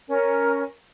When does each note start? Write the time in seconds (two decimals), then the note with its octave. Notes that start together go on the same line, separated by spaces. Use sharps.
0.08 C#4 A#4